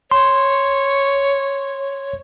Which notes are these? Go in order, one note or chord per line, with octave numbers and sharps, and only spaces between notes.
C#5 C6